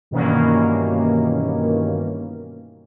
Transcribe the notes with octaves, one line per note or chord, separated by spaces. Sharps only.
G2 B2 D#3 E3 A#3 C#4